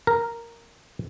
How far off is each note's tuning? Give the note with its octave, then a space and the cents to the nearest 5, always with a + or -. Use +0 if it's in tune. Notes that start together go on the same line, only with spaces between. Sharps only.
A#4 -5